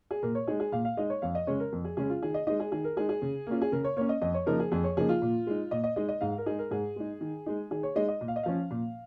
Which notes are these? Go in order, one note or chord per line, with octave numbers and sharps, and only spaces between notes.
G#4
A#2 A#4
C#5
G#3 D#4 G#4
G#4
A#2 F5
F5
G#3 D#4 D#5
C#5
F2 F5
D#5
C#3 G#3 C#4 C#5
A#4
F2
G#4
C#3 G#3 C#4 G#4
F4
D#3 G#4
D#5
G#3 D#4 D#5
G#4
D#3 G#4
A#4
G#3 D#4 G#4
G#4
C#3
A#3 C#4 F4
G#4
C#3 A#4
C#5
A#3 C#4 C#5
D#5
F2 D#5
C#5
C#3 F3 A#3 D#4 A#4
G#4
F2 G#4
C#5
C#3 F3 A#3 D#4 G#4
F4
A#2
G#3 D#4
A#2 D#5
D#5
G#3 D#4 D#5
D#5
G#2 F5
A#4
G#3 D#4 G#4
A#4
G#2 G#4
G#3 D#4
D#3
G#3 D#4
D#3 G#4
C#5
G#3 D#4 D#5
D#5
A#2
F5
D#5
F3 C#4 F5
A#2